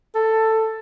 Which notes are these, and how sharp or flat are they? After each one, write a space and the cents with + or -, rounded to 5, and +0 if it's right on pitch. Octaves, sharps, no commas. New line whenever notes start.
A4 +10